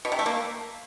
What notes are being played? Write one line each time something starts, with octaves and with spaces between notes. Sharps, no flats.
B2
C3
A3
A#3